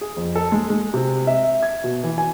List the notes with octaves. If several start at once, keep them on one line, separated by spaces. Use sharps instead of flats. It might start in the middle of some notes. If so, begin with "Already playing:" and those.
G#4
F2
A4
G#3
G#3
C3
E5
G#6
B2
E3
G#5